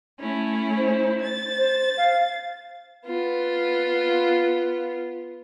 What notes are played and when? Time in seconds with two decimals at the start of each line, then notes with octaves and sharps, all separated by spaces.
0.20 A3 C#4 E4
0.77 C5
1.22 A6
1.58 C5
1.97 F5
3.07 B3 F4